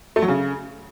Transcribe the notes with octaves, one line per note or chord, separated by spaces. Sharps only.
A3
F#3
C#3